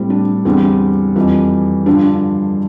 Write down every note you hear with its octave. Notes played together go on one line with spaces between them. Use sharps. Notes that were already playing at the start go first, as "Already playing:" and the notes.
Already playing: A2 G3 C4
D4
E2 D3 G3 C4
F2 E3 G3
G2 D3 F3 D4